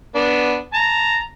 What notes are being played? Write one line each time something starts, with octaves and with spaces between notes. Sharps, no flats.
B3 D4
A5 A#5